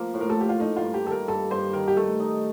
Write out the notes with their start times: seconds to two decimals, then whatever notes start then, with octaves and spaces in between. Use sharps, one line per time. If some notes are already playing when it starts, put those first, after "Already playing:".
Already playing: F3 A#3
0.14 A2
0.21 A#4
0.30 A4
0.37 A#3 G4
0.49 F4
0.59 A3 D#4
0.77 F4
0.82 G2
0.94 G4
1.05 D#3 A4
1.11 A#4
1.28 G2 A4
1.51 G2 C5
1.73 D#3 A#4
1.88 G4
1.97 A3 A4
2.20 D#4